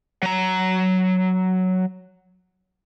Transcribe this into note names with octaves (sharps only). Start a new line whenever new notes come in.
F#3 A#5